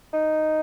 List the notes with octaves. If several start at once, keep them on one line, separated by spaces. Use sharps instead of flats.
D#4